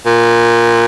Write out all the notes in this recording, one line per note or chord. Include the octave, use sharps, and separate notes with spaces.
A#2